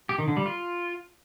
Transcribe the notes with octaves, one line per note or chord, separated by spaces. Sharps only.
G4
D#3
D3
G3
F4